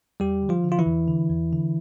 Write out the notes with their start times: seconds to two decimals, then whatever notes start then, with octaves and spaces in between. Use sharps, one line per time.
0.20 E2 G3 G4
0.42 D3
0.49 F3 F4
0.64 D3
0.72 F4
0.79 E3 E4
0.86 E2
1.08 D3
1.30 E2
1.53 D3